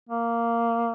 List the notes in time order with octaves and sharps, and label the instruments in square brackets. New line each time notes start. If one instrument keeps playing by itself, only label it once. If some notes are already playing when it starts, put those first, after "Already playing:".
[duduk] A#3